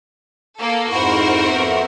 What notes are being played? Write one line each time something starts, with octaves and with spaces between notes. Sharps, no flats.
A#3 A4
F2 G#2 E4 F#4 A#4 C5
F2 B3 E5